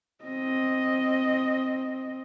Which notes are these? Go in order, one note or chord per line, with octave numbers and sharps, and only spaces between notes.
C4 D#5